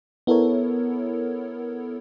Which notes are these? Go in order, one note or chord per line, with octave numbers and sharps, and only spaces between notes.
B3 E4 A4 A#4 C#5